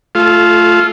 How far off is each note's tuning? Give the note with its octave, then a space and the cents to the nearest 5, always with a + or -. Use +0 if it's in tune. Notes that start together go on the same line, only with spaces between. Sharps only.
A3 +0 F4 +0 A4 -30